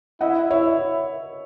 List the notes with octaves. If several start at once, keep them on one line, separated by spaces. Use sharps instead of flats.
E4 D#5 F#5
E4 C#5 E5